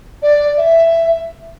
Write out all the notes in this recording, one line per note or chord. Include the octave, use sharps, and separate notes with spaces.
D5
E5